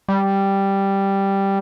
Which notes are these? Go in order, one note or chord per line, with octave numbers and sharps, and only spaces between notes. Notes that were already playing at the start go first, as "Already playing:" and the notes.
G3